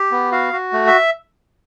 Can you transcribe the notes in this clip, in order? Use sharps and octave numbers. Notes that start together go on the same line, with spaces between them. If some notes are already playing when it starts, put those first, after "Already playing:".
Already playing: G4
B3
F#4 F5
F#4
A3
E5